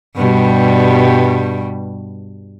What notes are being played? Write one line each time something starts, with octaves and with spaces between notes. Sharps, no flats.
G2 B2 G3